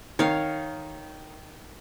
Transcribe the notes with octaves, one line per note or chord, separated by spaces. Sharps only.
D#3 C#5 F5